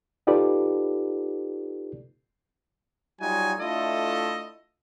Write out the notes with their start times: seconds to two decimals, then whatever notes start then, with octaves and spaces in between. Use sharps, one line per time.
0.27 D#4 F4 G4 A4 B4 D5
3.21 F#3 G3 D#4 F4 F#4 G#5
3.60 A3 D4 E4 F4 A4 D#5